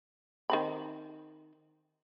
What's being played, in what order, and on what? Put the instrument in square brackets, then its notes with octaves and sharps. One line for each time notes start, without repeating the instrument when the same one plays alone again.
[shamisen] D#3 C4 B5